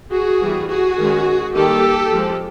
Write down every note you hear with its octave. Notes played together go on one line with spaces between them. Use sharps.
F#4 G#4
E3 G3 B3
F#4 G#4
D#3 G#3 C#4
D#3 G3 A#3 G4 A4
F3 G#3 C4